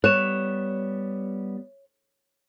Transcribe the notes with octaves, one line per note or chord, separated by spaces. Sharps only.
G3 B3 C#5 F#6 E7